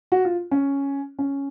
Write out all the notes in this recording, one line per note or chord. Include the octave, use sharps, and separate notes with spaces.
F#4
F4
C#4
C#4